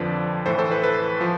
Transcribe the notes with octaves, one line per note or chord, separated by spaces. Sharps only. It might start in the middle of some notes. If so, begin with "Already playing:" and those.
Already playing: F2 D3 F3 B4 D5
A2 E3 A4 C5
A4 C5
B4
B4
F3